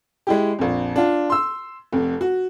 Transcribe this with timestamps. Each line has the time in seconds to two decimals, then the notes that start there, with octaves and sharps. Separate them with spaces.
0.27 G#3 E4 G4
0.59 A#1 F2
0.96 D4 F4
1.30 C6 E6
1.93 F1 F2
2.21 F#4